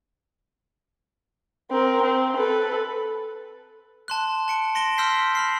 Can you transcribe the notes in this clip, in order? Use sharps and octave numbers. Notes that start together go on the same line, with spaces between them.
C4 A#4
C4
A4 B4
A5 C6 F#6
A5 C#7 D7
C6 A#6 D7 E7 G7
C6 E6 F6 G6 B6 C7
B5 F6 C7